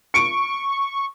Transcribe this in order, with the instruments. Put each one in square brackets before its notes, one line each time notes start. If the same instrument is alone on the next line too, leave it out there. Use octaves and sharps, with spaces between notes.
[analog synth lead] C#6 [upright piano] C#7 D7